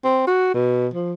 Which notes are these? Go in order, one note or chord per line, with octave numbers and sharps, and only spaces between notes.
C4
F#4
B2
F3